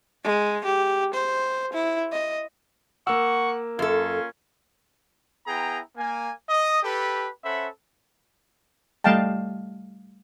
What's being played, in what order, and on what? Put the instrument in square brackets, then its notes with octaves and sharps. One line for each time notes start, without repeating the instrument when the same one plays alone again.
[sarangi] G#3
G4
C5
E4
D#5
[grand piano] A#3 E6 [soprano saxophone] F#5 [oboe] C#6
[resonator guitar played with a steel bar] F#2 A4 [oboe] C#4 [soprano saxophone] F4
[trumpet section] B3 E4 G#4 G5 A#5
A#3 G#5
D#5 D#6
G4 A4 B4
C#4 A4 C5 E5 F#5 B5
[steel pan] G3 A3 D#5 F5 G5 A5